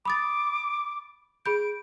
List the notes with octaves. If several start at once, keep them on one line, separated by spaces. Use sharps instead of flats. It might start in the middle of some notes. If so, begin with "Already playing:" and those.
B5 D6 D#6 A6
G#4 B5 G6 D7